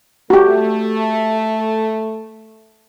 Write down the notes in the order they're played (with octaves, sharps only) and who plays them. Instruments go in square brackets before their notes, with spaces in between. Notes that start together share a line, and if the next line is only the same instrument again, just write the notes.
[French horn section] A3 [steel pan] F#4 G4